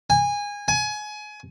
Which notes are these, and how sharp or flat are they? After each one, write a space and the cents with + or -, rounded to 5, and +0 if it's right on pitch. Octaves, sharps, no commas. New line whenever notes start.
G#5 -20
G#5 +25